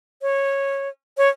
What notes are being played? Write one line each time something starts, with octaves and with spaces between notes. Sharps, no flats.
C#5
C#5